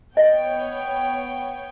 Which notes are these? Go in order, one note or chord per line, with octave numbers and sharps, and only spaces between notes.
B3 C#5 D#5 G5